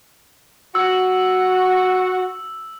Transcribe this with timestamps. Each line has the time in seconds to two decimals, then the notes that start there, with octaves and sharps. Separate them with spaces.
0.75 F#4 E6